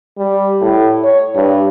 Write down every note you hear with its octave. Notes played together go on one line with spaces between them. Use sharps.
G3
A2
C#5
G2